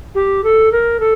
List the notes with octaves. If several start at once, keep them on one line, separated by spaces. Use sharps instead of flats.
G4
A4
A#4
A4